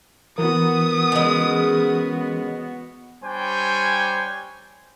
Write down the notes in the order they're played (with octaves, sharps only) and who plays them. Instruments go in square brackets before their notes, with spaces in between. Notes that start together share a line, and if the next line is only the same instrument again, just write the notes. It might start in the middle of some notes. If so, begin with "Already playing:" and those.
[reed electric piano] E3 A#4 [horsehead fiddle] B3 F#4 [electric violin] D#6
[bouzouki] C#3 G#3
[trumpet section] G3 D4 C5 C#5 G5 G#5